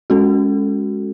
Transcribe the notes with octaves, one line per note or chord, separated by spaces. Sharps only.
G#3 C#4 F#4 A4